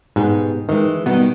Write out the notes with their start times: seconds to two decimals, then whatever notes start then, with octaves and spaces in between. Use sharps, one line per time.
0.16 G#2 B2 G4 G#4
0.69 D#3 E3 G#3
1.06 B2 D#3 G3 B3